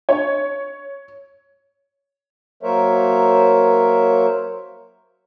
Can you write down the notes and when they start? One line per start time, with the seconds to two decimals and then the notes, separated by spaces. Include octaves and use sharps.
0.09 C#5
2.63 F#3 A#3 A#4 C5 C#5 E5